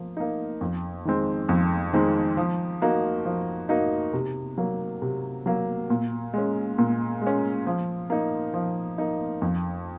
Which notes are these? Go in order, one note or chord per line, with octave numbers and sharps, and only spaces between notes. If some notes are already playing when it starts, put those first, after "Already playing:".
Already playing: F3 A#3
A#3 D#4
F2
D#3 G#3 C4
F2
D#3 G#3 C4
F3
A#3 D#4 F#4
F3
A#3 D#4 F#4
C3
F#3 A#3
C3
F#3 A#3
A#2
G#3 C#4
A#2
G#3
C#4
F3
A#3 D#4
F3
A#3 D#4
F2